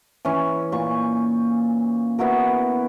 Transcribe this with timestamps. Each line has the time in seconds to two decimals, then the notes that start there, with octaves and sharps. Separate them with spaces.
0.25 E3 C#4
0.72 A#2 C#6
2.19 B3 E4 F#4 A#4